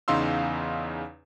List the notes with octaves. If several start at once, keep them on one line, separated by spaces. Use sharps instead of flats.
E2 C#3 D#4 F5 C6 E6